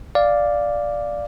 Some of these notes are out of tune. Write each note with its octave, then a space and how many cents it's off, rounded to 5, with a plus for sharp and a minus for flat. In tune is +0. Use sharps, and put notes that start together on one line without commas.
D5 +0 F5 +0